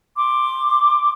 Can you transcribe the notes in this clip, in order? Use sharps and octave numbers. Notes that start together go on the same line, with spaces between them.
C6 D6